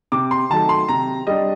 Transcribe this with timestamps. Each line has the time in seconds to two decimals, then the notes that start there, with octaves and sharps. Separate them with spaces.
0.12 C3 D6
0.31 C6
0.50 D#3 F#3 A3 A5
0.69 C6
0.89 C3 A#5
1.27 G3 D4 D#5